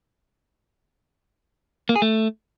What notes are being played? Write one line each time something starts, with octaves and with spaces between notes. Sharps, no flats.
A#3
G#4
A3